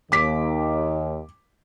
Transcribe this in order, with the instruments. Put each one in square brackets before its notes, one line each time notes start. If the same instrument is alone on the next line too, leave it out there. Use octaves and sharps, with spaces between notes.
[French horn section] D#2 [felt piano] D6 B6